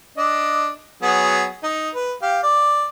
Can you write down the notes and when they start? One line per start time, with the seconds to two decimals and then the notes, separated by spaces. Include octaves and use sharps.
0.17 D4 D#5
1.02 F#3 B3 G#4
1.63 D#4
1.95 B4
2.22 G4 F5
2.43 D5